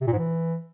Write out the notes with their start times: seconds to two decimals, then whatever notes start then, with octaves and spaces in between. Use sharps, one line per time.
0.01 C3
0.07 A#2
0.13 G#2
0.18 E3